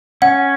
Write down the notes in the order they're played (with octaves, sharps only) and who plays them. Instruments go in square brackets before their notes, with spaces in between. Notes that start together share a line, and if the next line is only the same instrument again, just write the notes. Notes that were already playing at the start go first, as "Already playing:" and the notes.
[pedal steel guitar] C#4 [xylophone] F#5